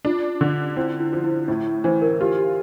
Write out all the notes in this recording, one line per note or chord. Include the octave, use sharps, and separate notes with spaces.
D4 F4
D3
C4 E4
E4
F3
E4
A2 E4
E3 C5
A#4
F4 G4
G4